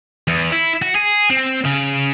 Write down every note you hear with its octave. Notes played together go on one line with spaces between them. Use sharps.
E2
E4
F#4
G#4
C4
C#3